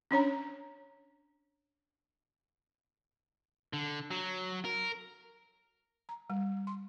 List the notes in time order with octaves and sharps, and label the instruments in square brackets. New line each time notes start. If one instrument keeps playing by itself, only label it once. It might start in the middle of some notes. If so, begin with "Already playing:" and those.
[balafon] C#4 D4 C#5 A#5
[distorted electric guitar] D3
F#3
A#4
[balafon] A#5
G3
C6